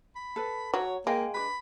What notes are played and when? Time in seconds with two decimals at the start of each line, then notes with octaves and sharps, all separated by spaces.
0.16 B5
0.36 A4 B4
0.74 F#3 C#5
1.07 G#3 A#3 F5 G5 G#5
1.34 D4 G4 B4 B5